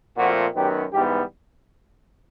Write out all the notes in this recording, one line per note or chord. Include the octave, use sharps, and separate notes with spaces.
A#2 F3 A3 C4 F#4
F#2 D#3 F#3 B3 G4
G#2 E3 G3 B3 G4